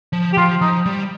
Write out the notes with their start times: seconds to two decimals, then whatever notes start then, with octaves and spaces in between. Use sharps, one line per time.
0.13 F3
0.33 G4
0.37 F3 F4
0.61 F3 D#4
0.86 G3